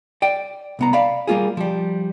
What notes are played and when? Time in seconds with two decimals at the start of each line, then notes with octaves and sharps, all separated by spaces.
0.22 D5 G5
0.79 C2 B3 A#5
0.93 D5 F5 B5
1.27 G3 A#3 F4 G#4
1.57 F3 G3